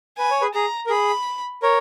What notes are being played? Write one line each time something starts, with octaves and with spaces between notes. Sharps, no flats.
B4 G#5
C#5
G#4 B4
G#4 A#5
A#4
G#4 B5
A#4 C#5